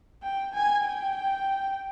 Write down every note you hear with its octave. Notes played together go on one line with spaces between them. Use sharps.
G5
G#5
G5